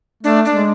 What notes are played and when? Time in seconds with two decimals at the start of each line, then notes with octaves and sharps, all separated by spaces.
0.23 A3 D4
0.45 D4
0.53 G#3